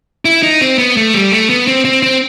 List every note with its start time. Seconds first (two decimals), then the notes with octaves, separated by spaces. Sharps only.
0.25 E4
0.43 D#4
0.61 C4
0.78 B3
0.97 A3
1.14 G3
1.32 A3
1.50 B3
1.68 C4
1.85 C4
2.03 C4